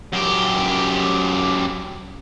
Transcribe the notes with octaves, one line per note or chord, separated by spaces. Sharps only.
F#2 G4